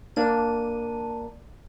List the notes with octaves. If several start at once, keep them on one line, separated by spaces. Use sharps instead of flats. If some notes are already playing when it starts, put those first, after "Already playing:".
A#3 D4 D#7